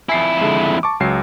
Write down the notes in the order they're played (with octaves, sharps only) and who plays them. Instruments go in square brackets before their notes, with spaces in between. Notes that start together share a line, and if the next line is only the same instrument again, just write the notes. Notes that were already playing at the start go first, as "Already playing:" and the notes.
[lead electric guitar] F2 E4 [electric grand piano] G#5 C7
[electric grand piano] D3 G#3
A5 C#6 D6
C#2 F#3 C7